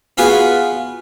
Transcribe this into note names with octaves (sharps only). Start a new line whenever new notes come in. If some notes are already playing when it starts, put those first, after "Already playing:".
B3 F4 F#4 G#4 B4